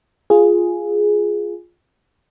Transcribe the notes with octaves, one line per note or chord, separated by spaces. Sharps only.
F4 G#4